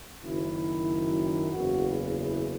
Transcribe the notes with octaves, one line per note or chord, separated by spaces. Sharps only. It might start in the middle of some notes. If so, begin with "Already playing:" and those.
F#1 F#2 D#3 E4
F#1 E2 C#3 F#4
E4
E4